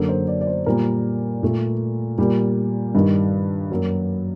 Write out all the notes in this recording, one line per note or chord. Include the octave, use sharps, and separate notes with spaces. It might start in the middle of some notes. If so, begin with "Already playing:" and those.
Already playing: F#2 D3 F#3 A#3 A4
C5
D5
D5
C5
A#2 G3 A#3 A#4
A#2 A3
A#2 G3 A#3
G2 D#3 G3
F#2 F#3 A#3